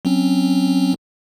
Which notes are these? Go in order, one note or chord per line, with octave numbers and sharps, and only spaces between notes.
F#3 C4 C#4